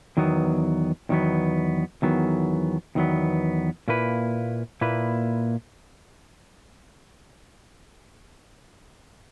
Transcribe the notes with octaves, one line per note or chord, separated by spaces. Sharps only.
E2 D#3 F#3 B3
E2 D#3 F#3 B3
E2 D#3 F#3 B3
E2 D#3 F#3 B3
A#2 A#3 E4 B4
A#2 A#3 E4 B4